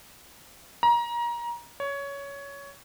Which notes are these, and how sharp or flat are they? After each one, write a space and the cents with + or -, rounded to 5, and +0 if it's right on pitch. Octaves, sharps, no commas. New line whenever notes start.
A#5 +25
C#5 +15